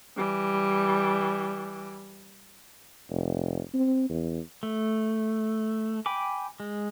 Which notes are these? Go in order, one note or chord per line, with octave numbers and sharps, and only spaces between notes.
E3 G3
F1
C4
E2
A3
G5 G#5 B5 D6
G#3